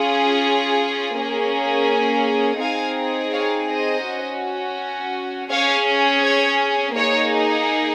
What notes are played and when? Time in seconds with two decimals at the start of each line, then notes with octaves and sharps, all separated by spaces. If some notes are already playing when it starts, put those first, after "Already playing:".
Already playing: C#4 F4 G#4
1.15 A#3 C#4 G#4
2.60 C4 D#4 G#4 F5 G#5
3.32 C#5 F5
3.69 C5 D#5
4.05 C#4 F#4
5.50 C#4 G#4 C#5 F5
6.23 C#5
6.95 A#3 D#4 G#4 C#5